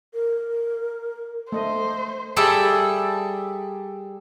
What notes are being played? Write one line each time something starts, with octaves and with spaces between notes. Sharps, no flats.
A#4
A3 C5 D#5
G3 G#4 A4 D5 E5 A5